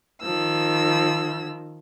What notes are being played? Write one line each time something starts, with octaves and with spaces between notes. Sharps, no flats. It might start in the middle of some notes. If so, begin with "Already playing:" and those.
D#3 F3 E6